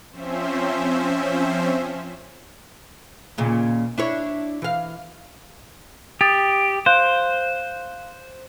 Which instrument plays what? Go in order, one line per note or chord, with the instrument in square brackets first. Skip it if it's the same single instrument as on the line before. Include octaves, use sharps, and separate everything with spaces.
[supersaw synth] F3 C4 C#4 C5 E5
[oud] D#2 A#2 C#3
D4 E4 C#5
E3 F5
[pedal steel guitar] G4 [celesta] D#6 A6
[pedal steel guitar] C5 [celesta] F5 F#6 G6